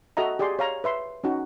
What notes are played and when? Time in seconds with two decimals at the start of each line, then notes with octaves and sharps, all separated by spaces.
0.17 F#4 A4 D#5 E5 A#5
0.39 G4 G#4 D5 G5 C6
0.59 C#5 F5 A#5
0.84 B4 E5 C6
1.24 C#4 D#4 F#4